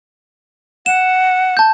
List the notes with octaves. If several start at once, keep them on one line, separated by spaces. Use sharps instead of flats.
F#5 E7
A5 G6